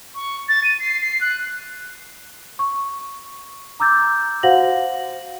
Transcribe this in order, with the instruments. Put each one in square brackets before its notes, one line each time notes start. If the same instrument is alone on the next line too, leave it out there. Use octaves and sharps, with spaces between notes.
[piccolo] C#6
A6
D#7
C7
C7
F#6
[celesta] C#6
A#5 D6 E6 G6 A6
F#4 C5 F5 F#5 A#6 F#7